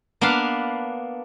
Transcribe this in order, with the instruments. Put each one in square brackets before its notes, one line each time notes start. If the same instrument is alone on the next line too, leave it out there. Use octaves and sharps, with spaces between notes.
[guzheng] A#3 B3 D4 B4 F5